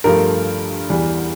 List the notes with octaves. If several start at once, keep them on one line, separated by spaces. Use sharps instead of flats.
G2 F3 A3 A#4
E2 E3 G3